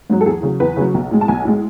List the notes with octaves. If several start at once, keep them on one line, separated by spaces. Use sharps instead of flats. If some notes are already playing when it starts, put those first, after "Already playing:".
G#2 F#3
A4
E2 G#4
C#3 F#3
E2 B4
C#3 F#3
B1
A2 G#3
A5
B1 G#5
A2 G#3